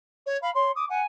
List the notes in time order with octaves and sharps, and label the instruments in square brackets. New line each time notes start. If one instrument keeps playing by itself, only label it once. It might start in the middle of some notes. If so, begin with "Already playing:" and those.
[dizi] C#5
[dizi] F5 [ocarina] B5
[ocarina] C#5 [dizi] C6
[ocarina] D6 [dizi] D#6
[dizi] F#5 [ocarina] G#5